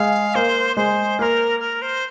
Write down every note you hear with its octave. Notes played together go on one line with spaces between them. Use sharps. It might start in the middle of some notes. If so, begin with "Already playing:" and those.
Already playing: G#3 F5
A#3 C5
G#3 C5
A#3 A#4 C5
A#4
C5